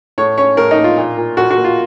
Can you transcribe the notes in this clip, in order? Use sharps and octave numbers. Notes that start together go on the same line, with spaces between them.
A2 C#5
C#4 C#5
A2 A#4
D#4
A#3
F4
A#2
A#2
A#2 F#4
F#4
A#3
F4